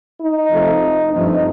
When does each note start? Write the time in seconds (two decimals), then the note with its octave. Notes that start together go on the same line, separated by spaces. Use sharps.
0.21 D#4
0.52 F2 C3 F3 A3
1.12 G2 F3 A3 C4 D#4